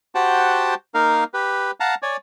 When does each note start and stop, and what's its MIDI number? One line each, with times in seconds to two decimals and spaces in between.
0.15 0.74 66
0.15 0.74 67
0.15 0.74 72
0.15 0.74 78
0.15 0.74 79
0.15 0.74 81
0.94 1.24 58
0.94 1.24 63
0.94 1.24 70
0.94 1.24 77
1.34 1.71 67
1.34 1.71 71
1.80 1.95 77
1.80 1.95 78
1.80 1.95 81
1.80 1.95 82
2.02 2.17 73
2.02 2.17 74
2.02 2.17 80